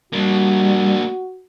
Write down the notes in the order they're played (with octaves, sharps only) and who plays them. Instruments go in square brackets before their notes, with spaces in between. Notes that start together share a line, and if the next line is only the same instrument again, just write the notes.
[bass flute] G3 [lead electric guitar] A#3 D4 [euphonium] F#4